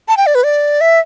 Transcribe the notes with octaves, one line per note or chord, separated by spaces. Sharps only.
A5
G5
D5
B4
D5
E5